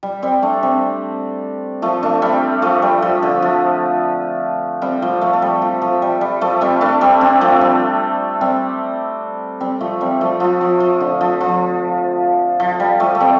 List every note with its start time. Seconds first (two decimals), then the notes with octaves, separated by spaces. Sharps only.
0.03 G3
0.23 G3 C4
0.42 A3 D4
0.63 G3 C4
1.82 F3 A3
2.03 A3 D4
2.22 G3 C4
2.62 F3 A3
2.82 G3
3.03 F3
3.23 D3
3.42 F3
4.82 G3 C4
5.02 F3 A3
5.21 F3 A3
5.33 A3
5.42 G3
5.62 F3
5.82 F3
6.02 G3
6.21 G3
6.41 F3 A3
6.61 G3 C4
6.81 A3 D4
7.01 G3 C4
7.21 G3 C4
7.41 F3 A3
7.61 G3 C4
8.41 G3 C4
9.60 G3 C4
9.81 F3 A3
10.01 G3 C4
10.21 F3 A3
10.40 F3
10.61 F3
10.80 F3
11.00 D3
11.21 F3
11.41 F3
12.60 F3
12.80 G3
13.00 F3 A3
13.15 A3
13.20 G3 C4